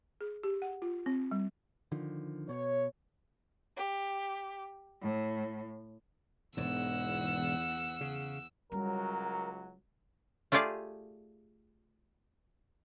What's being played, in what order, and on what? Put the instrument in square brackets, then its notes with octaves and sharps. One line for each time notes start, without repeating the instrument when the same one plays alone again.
[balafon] G#4
G4
F#5
F4
C4
G3
[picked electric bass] D3 D#3 F3
[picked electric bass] B2 [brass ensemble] C#5
[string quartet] G4
A2
[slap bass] E1 G#2 [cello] E2 F#5 [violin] E6
[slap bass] C#3
[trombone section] C#2 F#3 [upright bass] G3 C#4 [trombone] A#4
[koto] A3 F4 G4 G#4 D5 F5